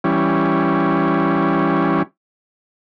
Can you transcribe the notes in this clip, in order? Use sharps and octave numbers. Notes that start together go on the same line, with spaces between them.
E3 G3 C#4